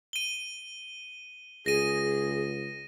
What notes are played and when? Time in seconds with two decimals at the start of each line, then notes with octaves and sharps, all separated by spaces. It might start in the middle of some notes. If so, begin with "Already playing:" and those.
0.13 D#7 G7
1.66 C#2 G#4 A#6 D#7